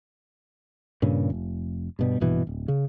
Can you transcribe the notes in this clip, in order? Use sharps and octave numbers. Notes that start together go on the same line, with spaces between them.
G2 A#2 C#3
F1
G2 B2 G3
A#1 G2 B2 E3
D1
C#3